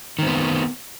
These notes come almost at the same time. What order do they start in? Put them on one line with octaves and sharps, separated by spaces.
D#3 C4 B3